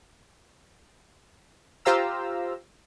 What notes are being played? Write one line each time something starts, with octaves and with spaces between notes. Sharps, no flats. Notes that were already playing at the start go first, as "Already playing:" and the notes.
F4 G4 C5 F5 A#5 E6